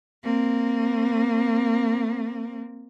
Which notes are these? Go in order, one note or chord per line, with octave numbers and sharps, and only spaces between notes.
A#3 C4